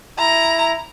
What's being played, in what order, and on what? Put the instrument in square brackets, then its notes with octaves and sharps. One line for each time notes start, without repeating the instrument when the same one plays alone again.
[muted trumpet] E4 [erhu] A#5